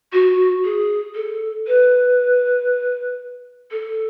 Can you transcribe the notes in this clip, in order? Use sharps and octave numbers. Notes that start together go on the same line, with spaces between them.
F#4
G#4
A4
B4
A4